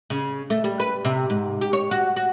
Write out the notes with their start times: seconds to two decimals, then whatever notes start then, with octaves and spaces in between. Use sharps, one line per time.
0.10 C#3
0.50 A3
0.64 G3
0.80 B4
1.05 C3
1.30 G#2
1.61 G4
1.73 C#5
1.91 F#4
2.16 F#4